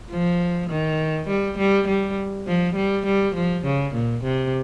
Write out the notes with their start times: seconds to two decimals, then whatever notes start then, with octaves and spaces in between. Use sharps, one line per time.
0.11 F3
0.70 D#3
1.28 G3
1.58 G3
1.87 G3
2.47 F3
2.76 G3
3.06 G3
3.35 F3
3.65 C#3
3.94 A#2
4.24 C3